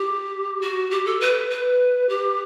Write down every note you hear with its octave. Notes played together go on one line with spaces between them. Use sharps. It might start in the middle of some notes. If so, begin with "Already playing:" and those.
Already playing: G4
F#4
G4
A4
B4
B4
G4